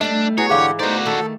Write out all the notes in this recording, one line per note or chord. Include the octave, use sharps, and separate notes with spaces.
G3 A3 D4 D#5
B3 E4 F#4 G#4 C#5
G#2 D3 E3 G4 G#4 F5 F#5 D6
A3 B3 D#4 F#4 C5 D5
D#3 A3 A4